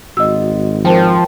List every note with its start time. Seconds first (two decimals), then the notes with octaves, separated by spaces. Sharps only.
0.17 G#1 F#4 D#5 E6
0.85 F3 A#4 C5 G5 A5